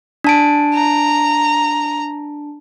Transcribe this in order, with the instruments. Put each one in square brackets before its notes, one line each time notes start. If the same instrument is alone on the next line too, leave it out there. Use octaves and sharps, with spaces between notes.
[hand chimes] D4 A5 D7
[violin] A#5